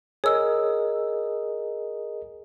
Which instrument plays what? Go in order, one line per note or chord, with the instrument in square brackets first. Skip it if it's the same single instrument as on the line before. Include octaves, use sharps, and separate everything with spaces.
[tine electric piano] G#4 A#4 D#5 [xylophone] C#5 E6